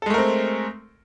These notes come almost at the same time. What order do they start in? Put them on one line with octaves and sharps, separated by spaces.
A4 G#3 A3 A#4 C4